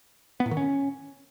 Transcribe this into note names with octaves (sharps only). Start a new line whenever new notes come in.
B3
A2
D#3
C#4